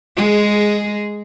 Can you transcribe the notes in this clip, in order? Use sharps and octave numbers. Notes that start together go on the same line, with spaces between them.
G#3 G#4